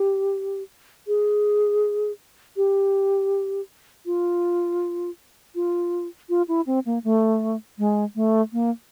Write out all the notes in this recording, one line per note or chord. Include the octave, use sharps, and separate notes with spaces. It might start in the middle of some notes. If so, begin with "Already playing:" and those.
Already playing: G4
G#4
G4
F4
F4
F4
E4
C4
A#3
A3
G#3
A3
A#3